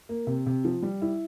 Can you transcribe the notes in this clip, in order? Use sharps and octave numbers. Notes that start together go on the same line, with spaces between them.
A#3
C3
C3
F3
G3
E4